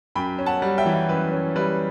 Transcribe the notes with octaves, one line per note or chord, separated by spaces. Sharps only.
F#2 G5 B5
C#4
F#5 A5
G3
E5 G5
E3
F#2 B4
C#4
G3 B4